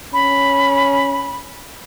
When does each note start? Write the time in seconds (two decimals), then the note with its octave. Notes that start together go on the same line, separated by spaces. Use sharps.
0.13 C#4 B5